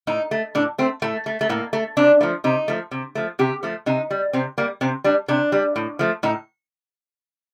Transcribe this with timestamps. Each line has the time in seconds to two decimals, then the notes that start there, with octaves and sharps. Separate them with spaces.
0.07 A2 D#4
0.31 A3
0.55 A2 D4
0.78 A3 C4
1.02 A2 A3
1.26 A3
1.41 A3
1.49 A2 A#3
1.73 A3
1.97 C3 D4
2.21 F3 A3
2.44 C3 D#4
2.68 F3 A3
2.91 C3
3.15 F3 A3
3.39 C3 G4
3.63 F3 A3
3.86 C3 D#4
4.11 G3
4.33 C3 C4
4.58 G3 A#3
4.81 C3 C4
5.04 G3 D4
5.28 C3 D4
5.52 G3
5.76 A2
5.99 F3 A3
6.23 A2 D#4